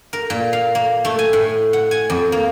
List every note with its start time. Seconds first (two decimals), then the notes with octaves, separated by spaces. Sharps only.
0.13 A#4
0.30 A#2
0.53 F5
0.75 A#3
1.05 A3
1.19 G#5
1.33 A2
1.73 F#5
1.91 G#5
2.10 F2
2.32 A#3